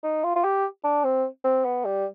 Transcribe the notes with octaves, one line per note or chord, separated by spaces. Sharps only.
D#4
F4
F4
G4
D4
C4
C4
B3
G3